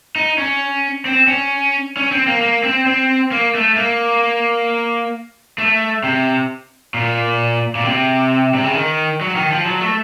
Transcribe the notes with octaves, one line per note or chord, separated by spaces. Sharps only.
D#4
C#4
C4
C#4
C#4
C4
A#3
A#3
C4
C4
A#3
A3
A#3
A3
C3
A#2
A#2
C3
C3
C#3
D#3
F#3
D#3
F3
F#3
A3